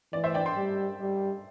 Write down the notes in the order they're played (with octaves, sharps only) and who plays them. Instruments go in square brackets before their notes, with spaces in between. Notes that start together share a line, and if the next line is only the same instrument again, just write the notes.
[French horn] E3 [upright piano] D5
[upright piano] C5 E5
D5 G5
G5 C6
[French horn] G3
G3